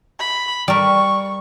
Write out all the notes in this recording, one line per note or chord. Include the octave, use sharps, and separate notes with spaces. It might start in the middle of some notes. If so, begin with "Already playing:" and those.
B5
G3 A#4 C#6